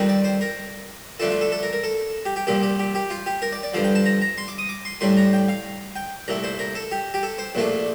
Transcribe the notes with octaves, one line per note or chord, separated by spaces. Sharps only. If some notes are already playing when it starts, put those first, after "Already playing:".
Already playing: F2 D#3 G3 C4 D#4
D5
C5
A#4
F2 D3 A3 D4 F4 A4
F4
A4
A4
A#4
A#4
A4
G4
G4
C2 A#2 F3 G4
G4
G4
G4
F4
G4
A#4
D5
D5
G2 D3 F3 F5
G5
A5
A#5
A#5
C6
D6
D#6
D6
C6
A2 G3 D4 C6
A#5
G5
F5
G5
C2 A#2 A3 A#5
C5
A#4
A4
G4
G4
A4
C5
A#1 A#2 A3 D4 F4